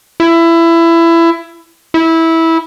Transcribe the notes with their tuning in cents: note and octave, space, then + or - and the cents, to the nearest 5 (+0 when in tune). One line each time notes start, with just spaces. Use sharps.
E4 +20
E4 -15